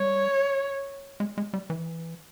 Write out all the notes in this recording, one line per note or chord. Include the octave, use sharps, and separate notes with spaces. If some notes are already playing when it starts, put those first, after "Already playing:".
Already playing: G3 C#5
G#3
G#3
G3
E3